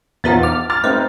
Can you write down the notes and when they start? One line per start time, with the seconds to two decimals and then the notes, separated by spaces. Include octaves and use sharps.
0.24 A#1 E2 F3 B3 D#4 A6
0.43 D6 F6
0.70 D6 F6 A6
0.84 A3 C4 D#4 B4